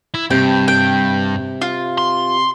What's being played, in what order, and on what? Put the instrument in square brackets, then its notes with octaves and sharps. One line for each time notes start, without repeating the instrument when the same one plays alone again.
[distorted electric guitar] E4
[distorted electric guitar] G2 [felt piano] C3 [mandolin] G5
[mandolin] G5
F4
[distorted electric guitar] C6